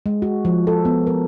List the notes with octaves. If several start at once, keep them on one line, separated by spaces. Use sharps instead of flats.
G#3
F#4
F3
A4
B3
A#4